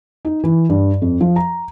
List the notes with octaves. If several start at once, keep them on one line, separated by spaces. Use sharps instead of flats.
D#4
E3
G2
F2
F3
A#5